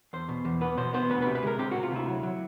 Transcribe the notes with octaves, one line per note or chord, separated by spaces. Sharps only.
E2 C5
B2
E2
B3 B4
B2 C5
B3 C5
D2 B4
C3 B4
B4
G#3 A#4
C3 G4
C3 F#4
F4
D2 E4
F#3
F#3